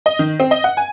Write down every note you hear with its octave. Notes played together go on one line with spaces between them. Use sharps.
D#5
D#3
C4
D#5
F#5
G#5